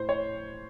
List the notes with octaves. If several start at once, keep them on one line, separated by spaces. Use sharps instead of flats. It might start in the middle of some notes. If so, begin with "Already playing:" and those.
Already playing: A2 C5
C#5